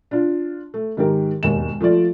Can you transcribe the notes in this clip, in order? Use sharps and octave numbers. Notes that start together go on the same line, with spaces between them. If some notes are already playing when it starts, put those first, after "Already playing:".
D4 F4
A3
G#2 D#3 G4 A#4
E1 D#2 G#2 E7
F3 A3 F4 D5